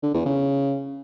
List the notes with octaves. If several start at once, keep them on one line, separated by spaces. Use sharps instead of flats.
D3
E2
C#3